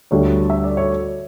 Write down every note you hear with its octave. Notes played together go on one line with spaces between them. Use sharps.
D2 D3 G3 C#5
E5
D5
C#5